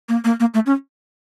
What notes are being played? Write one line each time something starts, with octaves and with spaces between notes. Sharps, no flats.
A#3
A#3
A#3
A3
C#4